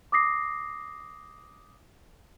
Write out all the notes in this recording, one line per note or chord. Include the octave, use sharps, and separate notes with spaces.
D6 D#6 A#6 C7